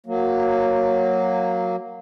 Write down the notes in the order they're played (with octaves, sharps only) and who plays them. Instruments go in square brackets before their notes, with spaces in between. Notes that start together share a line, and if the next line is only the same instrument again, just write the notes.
[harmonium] F#3 A#3